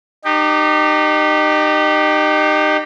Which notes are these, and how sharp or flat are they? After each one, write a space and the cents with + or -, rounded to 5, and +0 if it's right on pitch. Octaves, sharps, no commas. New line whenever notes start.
D#4 -30 G4 +0